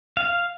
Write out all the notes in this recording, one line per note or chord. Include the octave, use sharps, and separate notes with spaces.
F5